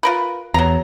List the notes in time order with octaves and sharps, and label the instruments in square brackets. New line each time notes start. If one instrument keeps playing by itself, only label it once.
[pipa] F4 A#4 B4
[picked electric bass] E2 [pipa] F#3 A#5